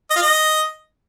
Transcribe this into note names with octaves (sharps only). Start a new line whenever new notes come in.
D#5
F4
D#5